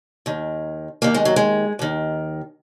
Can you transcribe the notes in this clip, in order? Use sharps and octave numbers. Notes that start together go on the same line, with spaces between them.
D#2 D#3
D#2 D#3 A#3
G#3
F#3
G#3
D#2 D#3